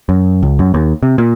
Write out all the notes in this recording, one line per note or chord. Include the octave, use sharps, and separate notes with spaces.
F#2
C#2
F#2
D#2
C3
A#2